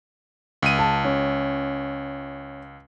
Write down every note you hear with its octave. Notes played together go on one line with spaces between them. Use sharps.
C#2 D#7
A5
C#4